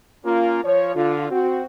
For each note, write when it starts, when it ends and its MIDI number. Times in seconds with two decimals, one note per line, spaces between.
0.25 0.63 58
0.25 0.63 61
0.25 0.63 65
0.64 0.91 53
0.64 0.91 73
0.95 1.26 50
0.95 1.26 65
1.31 1.65 60
1.31 1.65 66